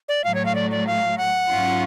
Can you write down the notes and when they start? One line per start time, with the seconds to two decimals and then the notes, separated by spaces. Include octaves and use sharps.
0.09 D5
0.24 A2 F#3 A3 F5
0.35 C#5
0.45 F5
0.55 D5
0.71 D5
0.87 F5
1.18 F#5
1.48 G#2 F#3 C#4 F4